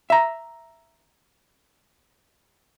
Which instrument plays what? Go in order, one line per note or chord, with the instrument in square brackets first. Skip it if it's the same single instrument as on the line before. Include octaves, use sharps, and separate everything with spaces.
[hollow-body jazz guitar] E5 A#5